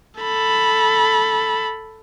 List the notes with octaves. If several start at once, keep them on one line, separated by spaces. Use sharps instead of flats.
A4 B5